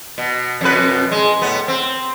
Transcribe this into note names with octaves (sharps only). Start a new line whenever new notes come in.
B2
F2 B2 B4
G#3
A2 B3
C4